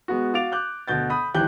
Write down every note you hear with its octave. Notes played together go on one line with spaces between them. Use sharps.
G#3 B3 F#4
F#4 F5 D6 A6 D7 F7
D6 F#6 G6
D2 B2 G6 A6
B5 D#6 G6
D#1 G#1 E3 G4 F#6 G6